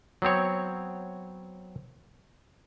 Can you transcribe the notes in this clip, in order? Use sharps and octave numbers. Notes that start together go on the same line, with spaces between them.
F#3 B3 C4 C#5